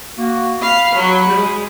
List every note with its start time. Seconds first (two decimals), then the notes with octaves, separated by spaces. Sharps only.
0.18 A#3 F#4
0.62 F5 B5
0.95 F#3 F#4
1.28 G#3